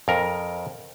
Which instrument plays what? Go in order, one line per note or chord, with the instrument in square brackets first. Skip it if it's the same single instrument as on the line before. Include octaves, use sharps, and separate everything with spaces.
[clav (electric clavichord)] F2 A#4